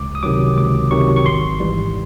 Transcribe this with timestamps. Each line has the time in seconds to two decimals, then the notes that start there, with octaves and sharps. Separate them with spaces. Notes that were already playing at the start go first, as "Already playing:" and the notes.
Already playing: C#2 D6
0.15 D#6
0.23 C3 D#3 F#3 D6
0.57 C#2 D6
0.91 C3 D#3 F#3 C#6
1.16 C#6
1.25 G#1 C6
1.60 G#2 E3 G3